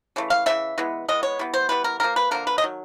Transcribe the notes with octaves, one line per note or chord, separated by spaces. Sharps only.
C#3 E3 A3
F5
C#3 E3 A3 E5
E3 G#3 B3
E3 G#3 B3 D#5
C#5
E3 G3 B3
C5
E3 G3 B3 B4
A#4
D3 F3 A#3 A#4
B4
D3 F3 A#3 A#4
B4
D#5
D#3 F#3